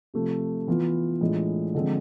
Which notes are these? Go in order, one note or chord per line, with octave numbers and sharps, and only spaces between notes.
C3 F3 A3
E3 B3 F4
A2 E3 G#3 D4 F4
D3 F3 G#3 C4